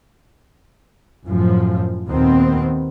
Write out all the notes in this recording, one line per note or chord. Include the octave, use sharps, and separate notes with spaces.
F#2 A2 F3
D#2 A#2 D#3 B3 C4